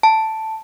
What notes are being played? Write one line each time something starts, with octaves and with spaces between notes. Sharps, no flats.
A5